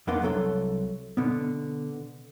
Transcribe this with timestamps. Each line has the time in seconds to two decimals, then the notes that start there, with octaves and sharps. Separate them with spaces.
0.07 F2 A#3 B3 D4 F5 C6
0.22 C2 F#3 A4 C6
1.17 B2 D3 B3